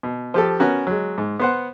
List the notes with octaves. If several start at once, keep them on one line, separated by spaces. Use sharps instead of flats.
B2
F3 G4 A4
B3 C#4 F#4 A#4
F#3 G#3
G#2
B3 C5 F#5